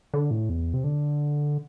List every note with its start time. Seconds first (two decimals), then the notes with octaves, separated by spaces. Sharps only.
0.14 D3
0.31 A2
0.49 E2
0.74 C3
0.84 D3